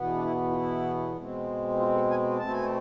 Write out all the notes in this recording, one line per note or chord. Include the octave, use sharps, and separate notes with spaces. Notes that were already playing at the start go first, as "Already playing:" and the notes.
Already playing: E2 B2 B3
D4
E4
F4
E4
B2 G#3 C4
F4
A4
G#5
B2 A3 C4 A5
G#5